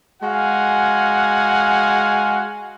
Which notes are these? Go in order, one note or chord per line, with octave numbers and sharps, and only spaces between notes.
G#3 F#4 F5 F#5 G#5